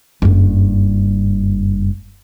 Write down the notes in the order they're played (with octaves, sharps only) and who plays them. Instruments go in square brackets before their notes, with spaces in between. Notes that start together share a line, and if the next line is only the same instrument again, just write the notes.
[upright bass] F#1 G2